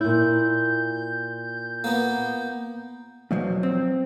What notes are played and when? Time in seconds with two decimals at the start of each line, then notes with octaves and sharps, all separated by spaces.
0.01 A#2 E4 G6
1.84 A#3 B3
3.31 E2 B2 F3 F#3
3.63 C4